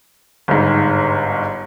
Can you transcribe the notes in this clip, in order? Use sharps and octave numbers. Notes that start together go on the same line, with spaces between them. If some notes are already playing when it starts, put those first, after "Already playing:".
G1 G#2